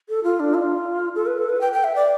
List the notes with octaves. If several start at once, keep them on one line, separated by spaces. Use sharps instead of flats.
A4
F4
D4
F4
A4
B4
A4
B4
G5
G5
E5
D5